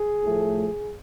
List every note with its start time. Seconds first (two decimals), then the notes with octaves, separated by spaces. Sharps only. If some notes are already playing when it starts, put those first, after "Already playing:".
Already playing: G#4
0.23 A2 F3 A3